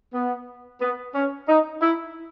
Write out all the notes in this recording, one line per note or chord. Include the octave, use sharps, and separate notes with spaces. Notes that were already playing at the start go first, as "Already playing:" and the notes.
B3
B3
C#4
D#4
E4